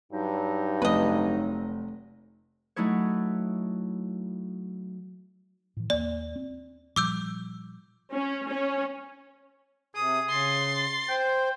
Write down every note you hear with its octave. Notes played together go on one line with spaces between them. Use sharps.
G2 F#3 D#4
F1 B4 D#5
F#3 A3 D#4 E4 C#5
A2 E3
D#2 A#3 D5
C4
A#2 F3 G3 D6 E6 G6
C#4
C#4
C3 G#4 D#6
C#3 C6 A6
C5 G5